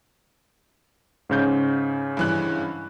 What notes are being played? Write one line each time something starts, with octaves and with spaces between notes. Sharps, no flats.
G#2 C#3 G6
G2 E3 F#6